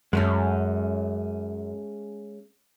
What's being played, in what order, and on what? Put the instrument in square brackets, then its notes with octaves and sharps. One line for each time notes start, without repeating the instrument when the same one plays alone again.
[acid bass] F#2 [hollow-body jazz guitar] G#3 A3 C#4